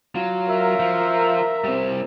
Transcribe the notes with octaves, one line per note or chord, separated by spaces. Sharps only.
F#3 F4
A#4 E5
F3
G3 C4